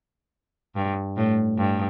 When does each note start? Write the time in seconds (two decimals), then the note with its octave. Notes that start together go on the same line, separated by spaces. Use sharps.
0.76 G2
1.17 A2
1.58 G2